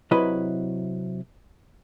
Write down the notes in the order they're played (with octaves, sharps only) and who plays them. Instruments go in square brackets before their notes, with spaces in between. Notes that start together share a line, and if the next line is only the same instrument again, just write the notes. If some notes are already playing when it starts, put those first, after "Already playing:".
[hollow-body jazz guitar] C3 F#3 E4 B4 D#5 B5